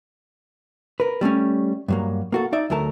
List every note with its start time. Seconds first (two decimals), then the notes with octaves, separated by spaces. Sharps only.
1.00 A#4 B4
1.21 G3 A3 A#3 C#4
1.88 G2 F#3 A#3
2.32 A#3 F#4 A4
2.52 D#4 D5 E5
2.70 D2 F#3 A3 A#4 A5